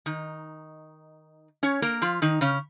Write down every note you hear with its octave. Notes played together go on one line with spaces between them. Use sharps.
D#3 D#4
C#4 C#5
A#3 A#4
F3 F4
D#3 D#4
C#3 C#4